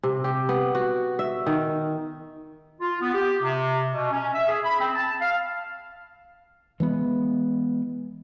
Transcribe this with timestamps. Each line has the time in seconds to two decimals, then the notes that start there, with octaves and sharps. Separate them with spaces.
0.03 C3
0.24 G4
0.49 B3
0.75 F#4
1.19 E5
1.46 D#3
2.81 F4
3.01 B3
3.14 G4
3.41 C3
3.92 B2
4.11 C#4
4.34 E5
4.48 G#4
4.64 B5
4.80 C4
4.95 A5
5.21 F5
6.80 E3 G#3 B3